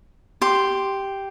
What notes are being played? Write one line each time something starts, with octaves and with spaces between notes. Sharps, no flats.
G4 C6